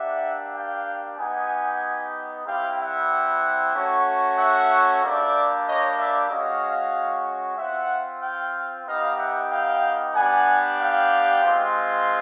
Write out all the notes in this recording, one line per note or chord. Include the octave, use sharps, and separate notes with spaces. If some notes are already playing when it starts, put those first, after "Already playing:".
Already playing: A#3 D4 G4 E5 F#5
F5 G5
B3 D#4 G4 F#5 G#5
G3 C4 E4 G4 F5 G5
E5 F#5
A3 C#4 F#4
E5 F#5
G3 A#3 D4 G4 D5 E5
C#5 D#5
D5 E5
G#3 C#4 F#4 D#5 F5
C4 F4 E5 F#5
F5 G5
B3 D#4 G4 D#5 F5
E5 F#5
F5 G5
B3 D4 G4 F#5 G#5
F5 G5
G#3 C4 F4